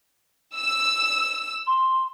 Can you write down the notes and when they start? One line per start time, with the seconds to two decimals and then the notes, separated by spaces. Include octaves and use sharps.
0.56 E6
1.67 C6